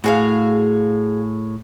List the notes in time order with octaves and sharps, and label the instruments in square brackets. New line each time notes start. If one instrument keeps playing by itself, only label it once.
[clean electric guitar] A2 [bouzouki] F#4 G#4 F5